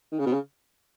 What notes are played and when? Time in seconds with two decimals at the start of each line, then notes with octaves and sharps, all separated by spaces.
0.12 D#3
0.19 C#3
0.26 B2
0.33 C#3